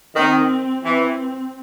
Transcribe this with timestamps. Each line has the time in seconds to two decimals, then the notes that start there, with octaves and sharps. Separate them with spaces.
0.15 D#3 C4
0.85 E3 C4